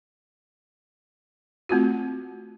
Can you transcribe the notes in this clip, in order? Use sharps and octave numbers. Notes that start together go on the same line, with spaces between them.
A3 C4 F4 F#4